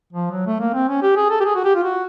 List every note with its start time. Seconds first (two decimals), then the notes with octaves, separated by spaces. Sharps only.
0.13 F3
0.31 F#3
0.47 A3
0.60 A#3
0.74 C4
0.89 C#4
1.02 G4
1.16 G#4
1.30 A4
1.41 G4
1.45 G#4
1.55 F#4
1.64 G4
1.75 F4
1.84 F#4